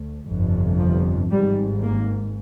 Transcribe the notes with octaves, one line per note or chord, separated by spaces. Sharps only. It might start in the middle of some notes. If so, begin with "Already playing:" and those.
Already playing: D2
G1 F2 C3
F3
G#1 G#2 G3
A#3